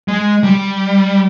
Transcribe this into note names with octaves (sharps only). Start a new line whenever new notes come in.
G#3
G3